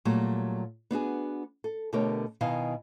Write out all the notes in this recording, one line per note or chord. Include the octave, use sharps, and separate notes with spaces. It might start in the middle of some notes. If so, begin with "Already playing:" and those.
A#2 F#3 G3 A3
B3 D4 F#4 G#4
A4
B2 D3 A3 G4 A#4 C#5
B2 D#3 E4 D#5 F5 G#5